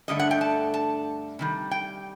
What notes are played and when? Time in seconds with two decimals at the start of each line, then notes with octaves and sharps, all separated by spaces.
0.08 G2 D3 A3 D#5
0.19 F#5
0.31 G5
0.41 A5
0.74 A5
1.39 C3 D#3 G3
1.71 G5